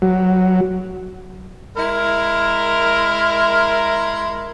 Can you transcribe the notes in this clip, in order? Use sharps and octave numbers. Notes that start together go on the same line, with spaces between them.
F#3
G#3 E4 A#4